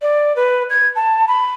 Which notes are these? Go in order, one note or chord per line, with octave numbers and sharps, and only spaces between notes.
D5
B4
G#6
A5
B5